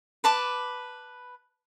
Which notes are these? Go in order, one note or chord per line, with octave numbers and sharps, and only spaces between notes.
B4 A5 D6